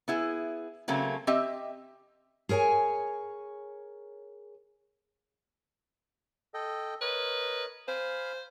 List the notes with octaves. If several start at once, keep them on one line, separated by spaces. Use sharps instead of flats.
B3 E4 G#4
C#3 F#3 A3 A#3 C4
C4 G4 D#5 E5
G#4 A#4 C#5 F#5 G#5
A4 D#5 G5
A#4 B4 C#5 D#5
C5 F5 G#5 B5